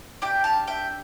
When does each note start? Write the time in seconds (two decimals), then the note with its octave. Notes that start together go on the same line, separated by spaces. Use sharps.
0.22 D4 G4 E5 G5
0.44 F5 A5
0.67 E5 G5